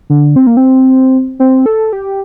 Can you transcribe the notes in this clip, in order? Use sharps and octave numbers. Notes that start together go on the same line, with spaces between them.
D3
C4
A#3
C4
C4
A4
G4